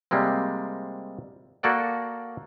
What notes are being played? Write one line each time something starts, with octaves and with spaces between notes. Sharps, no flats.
C3 G3 G#3 A#3 C4
A#3 F#4 A4 D5 F#5